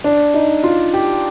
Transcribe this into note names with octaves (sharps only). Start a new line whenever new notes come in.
D4
D#4
F4
G4